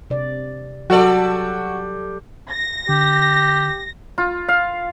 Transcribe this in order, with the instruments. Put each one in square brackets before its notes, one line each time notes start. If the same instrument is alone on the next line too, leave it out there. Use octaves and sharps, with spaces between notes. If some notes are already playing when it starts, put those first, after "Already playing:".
[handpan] C3 D5
[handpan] F#3 [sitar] G3 A4 D5 [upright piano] F#4
[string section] A#6
[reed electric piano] D3 [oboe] G4
[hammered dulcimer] F4
F5